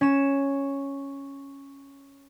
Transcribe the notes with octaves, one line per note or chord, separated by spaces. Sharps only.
C#4 E7